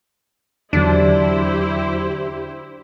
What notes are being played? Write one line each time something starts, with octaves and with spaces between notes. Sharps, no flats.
E2 D3 F#3 D4 E4 G4 C5